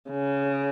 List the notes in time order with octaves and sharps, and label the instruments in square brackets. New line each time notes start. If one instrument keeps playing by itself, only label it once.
[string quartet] C#3